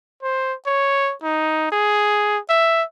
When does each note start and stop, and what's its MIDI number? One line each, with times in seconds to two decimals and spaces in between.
0.23 0.54 72
0.66 1.13 73
1.23 1.67 63
1.72 2.39 68
2.49 2.83 76